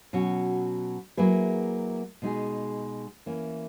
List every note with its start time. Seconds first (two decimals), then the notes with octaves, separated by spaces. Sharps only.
0.13 B2 F#3 C#4 F#4
1.17 F#3 A#3 E4 G#4 B4
2.22 B2 G#3 D#4 G#4
3.26 E3 A#3 C#4